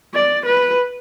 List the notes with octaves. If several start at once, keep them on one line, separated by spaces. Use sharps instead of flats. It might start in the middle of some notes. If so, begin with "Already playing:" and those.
D5
B4